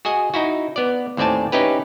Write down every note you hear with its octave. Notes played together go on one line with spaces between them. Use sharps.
F#4 G#4 D#5 G#5
D#4 E4 F#4
B3 D5
D#2 A2 C4 D5 G#5 A5
C#4 D#4 E4 G4 B4